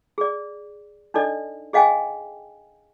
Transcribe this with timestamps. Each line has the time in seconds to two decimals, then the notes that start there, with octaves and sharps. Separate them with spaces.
0.18 G#4 D5
1.14 D4 D#4 A4 D5 D#5
1.73 G#4 D#5 F5 G5 G#5